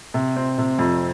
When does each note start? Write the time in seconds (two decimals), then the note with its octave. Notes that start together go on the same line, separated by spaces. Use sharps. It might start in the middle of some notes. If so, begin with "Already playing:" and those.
0.14 C3
0.36 C4
0.58 C3
0.79 F2